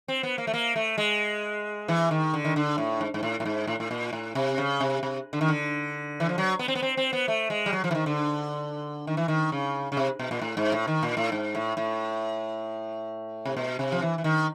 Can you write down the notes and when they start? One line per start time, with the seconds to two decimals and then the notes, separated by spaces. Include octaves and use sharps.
0.08 C4
0.23 B3
0.38 A#3
0.47 A3
0.54 A#3
0.76 A3
0.98 G#3
1.88 E3
2.11 D#3
2.34 D3
2.45 D#3
2.56 D3
2.78 A2
3.01 G#2
3.14 G#2
3.23 A2
3.40 A2
3.45 G#2
3.67 A2
3.80 A2
3.91 A#2
4.13 A2
4.35 C3
4.58 C#3
4.80 C3
5.03 C3
5.33 D3
5.41 D#3
5.48 D3
6.20 E3
6.29 F3
6.38 F#3
6.59 B3
6.68 C4
6.75 B3
6.82 C4
6.97 C4
7.13 B3
7.28 A3
7.50 G#3
7.66 G3
7.73 F#3
7.84 F3
7.91 E3
7.95 D#3
8.06 D3
9.07 D#3
9.17 E3
9.28 D#3
9.52 C#3
9.92 C#3
9.97 C3
10.19 B2
10.31 A#2
10.42 A2
10.57 G#2
10.72 A2
10.87 D#3
11.03 A#2
11.17 A2
11.32 G#2
11.55 A2
11.77 A2
13.45 C3
13.57 B2
13.79 C3
13.92 F3
14.02 E3
14.18 E3
14.24 D#3